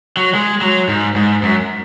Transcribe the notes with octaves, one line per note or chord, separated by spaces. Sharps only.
F#3
G#3
F#3
G#2
G#2
F#2